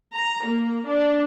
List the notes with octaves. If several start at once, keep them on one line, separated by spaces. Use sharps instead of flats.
A#5
A#3
D4